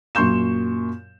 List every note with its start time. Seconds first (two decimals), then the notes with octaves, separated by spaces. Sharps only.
0.15 F#2 A#2 C6 C#6 G6 E7